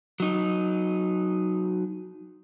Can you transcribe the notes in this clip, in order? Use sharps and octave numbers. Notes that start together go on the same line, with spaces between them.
F#3 D#4